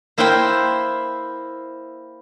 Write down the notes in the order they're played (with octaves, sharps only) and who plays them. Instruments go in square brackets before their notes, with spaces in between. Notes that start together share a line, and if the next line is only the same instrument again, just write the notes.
[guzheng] A#3 E4 A#4 C5 G5